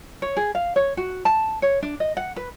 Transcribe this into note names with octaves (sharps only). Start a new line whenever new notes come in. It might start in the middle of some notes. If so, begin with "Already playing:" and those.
C#5
G#4
F5
C#5
F#4
A5
C#5
D4
D#5
F#5
B4